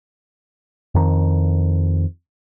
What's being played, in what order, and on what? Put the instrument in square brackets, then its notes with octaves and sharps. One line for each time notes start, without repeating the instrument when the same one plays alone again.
[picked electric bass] F2 D#3